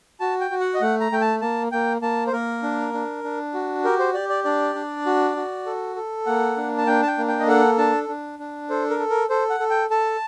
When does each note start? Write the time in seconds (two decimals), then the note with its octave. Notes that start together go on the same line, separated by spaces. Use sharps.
0.20 F#4 A5
0.41 G5
0.51 F#4
0.60 F#5
0.74 D#5
0.81 A3 F#5
1.01 A#5
1.12 A3 G5
1.21 A5
1.41 A#3 A5
1.72 A#3 G5
2.02 A#3 A5
2.27 C5
2.33 A#3 A#4
2.63 D4
2.93 D4
3.24 D4
3.54 F#4
3.84 G4 A#4
3.99 C5
4.14 G4 D5
4.29 D5
4.44 D4 D5
4.75 D4
5.06 F#4
5.36 F#4
5.66 A4
5.96 A4
6.26 A#3 F#5
6.57 D4
6.78 A5
6.87 D4 G5
7.03 A5
7.07 G5
7.18 A#3
7.28 G5
7.39 D#5
7.48 A4 F#5
7.78 D4 A5
8.08 D4
8.39 D4
8.69 A4 C5
8.90 A#4
8.99 A4
9.10 A#4
9.30 A4 C5
9.50 F#5
9.60 A4
9.70 G5
9.90 A4 A5